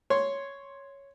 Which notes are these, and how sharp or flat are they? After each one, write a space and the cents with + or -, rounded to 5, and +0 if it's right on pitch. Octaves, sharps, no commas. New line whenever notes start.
C#5 +0 C6 +5